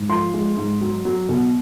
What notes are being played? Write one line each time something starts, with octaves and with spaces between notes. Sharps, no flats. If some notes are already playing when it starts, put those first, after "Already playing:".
Already playing: G#2
F3 C6
G#3
G#2
F#3
F#3
B2